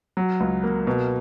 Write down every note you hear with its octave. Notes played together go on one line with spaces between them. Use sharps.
F#3
C#2
A#3
B2